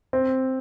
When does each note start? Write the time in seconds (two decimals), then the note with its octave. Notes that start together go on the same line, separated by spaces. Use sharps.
0.13 C4